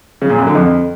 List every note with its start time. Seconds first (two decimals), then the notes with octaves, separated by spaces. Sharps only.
0.22 C#3
0.30 A#2
0.38 F#2
0.47 D3
0.55 F2